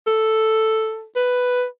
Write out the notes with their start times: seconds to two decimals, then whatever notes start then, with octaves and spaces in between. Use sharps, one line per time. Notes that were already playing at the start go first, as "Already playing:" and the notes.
0.07 A4
1.16 B4